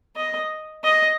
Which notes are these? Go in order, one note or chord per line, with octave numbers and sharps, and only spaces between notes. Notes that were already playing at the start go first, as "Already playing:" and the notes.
D#5
D#5